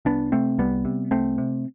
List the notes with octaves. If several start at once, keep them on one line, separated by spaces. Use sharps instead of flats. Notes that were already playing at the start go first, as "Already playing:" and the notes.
C2 B3 D4
C3 A3 C4
C2 G3 B3
C3
C2 A3 C4
C3